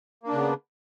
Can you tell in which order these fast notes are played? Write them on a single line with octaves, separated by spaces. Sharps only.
A#3 D4 C#3 B3